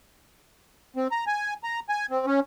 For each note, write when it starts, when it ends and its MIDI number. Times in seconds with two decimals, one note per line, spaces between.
0.97 1.08 60
1.11 1.25 82
1.27 1.54 80
1.64 1.80 82
1.89 2.06 80
2.11 2.26 60
2.26 2.40 61